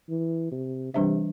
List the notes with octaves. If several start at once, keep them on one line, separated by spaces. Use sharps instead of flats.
E3
C3
C3 E3 G3 D4 C5 E5